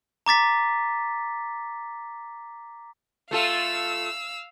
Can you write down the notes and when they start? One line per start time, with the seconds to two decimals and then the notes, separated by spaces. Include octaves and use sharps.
0.26 A#5 D6 A6 B6
3.31 A3 F4 A4 F5 E6